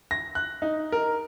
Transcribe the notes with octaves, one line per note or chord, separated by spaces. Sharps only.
A#6
F#6
D#4
A#4